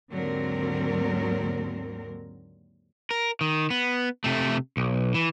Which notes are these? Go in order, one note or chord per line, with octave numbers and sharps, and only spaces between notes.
D#2 G#2 D3 F#3 C4 A#4
A#4
D#3
B3
C3 A3
B1
E3